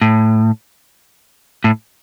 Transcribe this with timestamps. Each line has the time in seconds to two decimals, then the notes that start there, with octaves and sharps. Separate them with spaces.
0.02 A2
1.64 A2